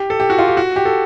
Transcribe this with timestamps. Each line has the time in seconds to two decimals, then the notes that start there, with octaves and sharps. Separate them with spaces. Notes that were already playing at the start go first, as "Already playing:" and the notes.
Already playing: G4
0.10 A4
0.20 G4
0.30 F#4
0.39 F4
0.48 G4
0.57 F#4
0.76 G4
0.85 A4